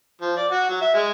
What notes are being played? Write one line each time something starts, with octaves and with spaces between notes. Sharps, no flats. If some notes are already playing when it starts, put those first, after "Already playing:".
F3
D5
F#4
F#3
E5
G#3